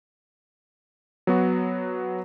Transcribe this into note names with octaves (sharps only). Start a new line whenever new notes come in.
F#3 B3 F#4